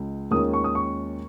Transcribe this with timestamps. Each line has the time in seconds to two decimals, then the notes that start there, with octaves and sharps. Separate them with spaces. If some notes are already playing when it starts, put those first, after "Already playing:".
Already playing: C#2 C#3 G#3
0.31 D#2 D#3 G#3 C#4 F4 D#6
0.53 C#6
0.64 D#6
0.75 C#6